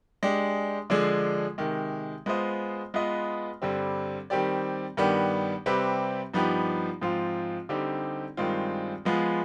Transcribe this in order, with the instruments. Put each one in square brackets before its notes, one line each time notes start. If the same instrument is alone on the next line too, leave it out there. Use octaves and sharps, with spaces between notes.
[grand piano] G#3 D4 G4
D3 F3 G#3 D4 G#4
C3 D#3 G#3
G#3 B3 F4 C5 D#5
G#3 B3 F4 B4 D#5
G2 D3 G3 C4
D#3 G3 C4 G4 D5
G2 D#3 B3 D4 G4
C3 G3 C4 G4 B4
G2 F3 B3 D#4 G4
G#2 F3 C4 F4
D3 G3 C4 D#4 G4
G2 D#3 G#3 C4 F4
F3 G#3 B3 F4 G#4